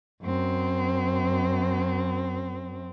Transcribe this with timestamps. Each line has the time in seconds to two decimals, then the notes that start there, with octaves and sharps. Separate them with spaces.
0.23 F#2 C4